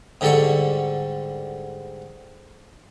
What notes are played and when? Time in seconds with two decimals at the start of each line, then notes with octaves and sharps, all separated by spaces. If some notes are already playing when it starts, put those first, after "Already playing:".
0.21 G#2 D3 G3 A4 D5 C#6